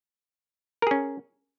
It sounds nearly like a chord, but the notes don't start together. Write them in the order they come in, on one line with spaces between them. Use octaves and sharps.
A#4 G#4 C#4